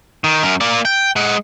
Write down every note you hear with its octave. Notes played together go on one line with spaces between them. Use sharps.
D#3
F#2 A#4
A#3 D5
G5
G#3 F#5